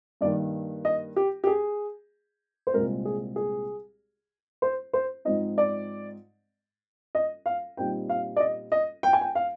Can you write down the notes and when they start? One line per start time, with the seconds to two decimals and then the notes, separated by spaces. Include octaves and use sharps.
0.21 G2 D#3 A#3 D5
0.85 D#5
1.16 G4
1.44 G4
1.47 G#4
2.67 C5
2.73 C2 A#2 G#3 C4 A#4
3.05 G#4
3.36 G#4
4.62 C5
4.93 C5
5.25 G#2 F3 C4 D#4 D#5
5.58 D5
7.15 D#5
7.46 F5
7.77 A#2 G3 C4 D#4 G5
8.09 F5
8.36 D5
8.40 D#5
8.72 D#5
9.03 G5
9.13 G#5
9.21 G5
9.35 F5